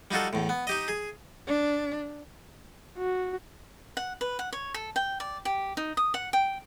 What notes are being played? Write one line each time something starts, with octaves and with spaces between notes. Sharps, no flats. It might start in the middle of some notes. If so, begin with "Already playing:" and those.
G3 D#4 F4 F#4 A4
E2 A2
B3
D#4 G4 D#5
G#4
D4
F#4
F#5
B4
F#5
C#5
A4
G5
D5
G4
D#4
D#6
F#5
G5